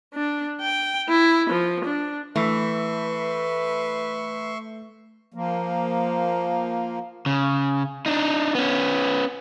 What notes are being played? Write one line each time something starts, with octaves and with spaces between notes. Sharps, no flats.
D4
G5
E4
F3
D4
E3 A3 B4 E5 C6 C#6
F3 A#3
C#3
D4 D#4
B3 C#4